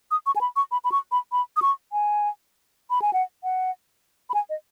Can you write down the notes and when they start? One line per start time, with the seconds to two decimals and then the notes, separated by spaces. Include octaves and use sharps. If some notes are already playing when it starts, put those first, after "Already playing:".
0.11 D#6
0.26 C#6
0.36 G#5
0.41 B5
0.56 C#6
0.72 B5
0.84 B5
0.92 C#6
1.12 B5
1.32 B5
1.57 D#6
1.62 C#6
1.92 G#5
2.90 B5
3.02 G#5
3.13 F#5
3.44 F#5
4.30 B5
4.34 G#5
4.50 D#5